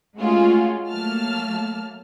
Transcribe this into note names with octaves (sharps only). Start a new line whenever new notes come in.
G#3 A3 C#4 F4 F#4 G#4
F#3 A3 A#3 A5 F6